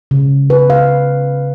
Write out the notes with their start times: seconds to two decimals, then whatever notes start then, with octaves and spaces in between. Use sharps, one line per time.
0.11 C#3
0.50 B4
0.70 F5